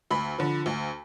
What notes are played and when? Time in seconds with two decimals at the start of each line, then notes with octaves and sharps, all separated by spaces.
0.11 D2 B5
0.38 D3 F3
0.66 D2